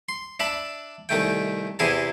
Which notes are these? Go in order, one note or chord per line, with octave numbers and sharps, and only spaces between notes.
C6
D4 E5 A5 B5
C2 D#3 A3 G5
E2 C3 E4 G#4 G#5 A5